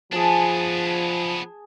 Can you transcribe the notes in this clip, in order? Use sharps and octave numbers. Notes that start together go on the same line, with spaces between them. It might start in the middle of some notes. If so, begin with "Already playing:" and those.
F3 B3 D4 G#4 A5